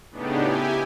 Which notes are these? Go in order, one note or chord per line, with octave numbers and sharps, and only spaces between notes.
A2 C#3 B3 D4 D#4 G4
E4 G4 G#5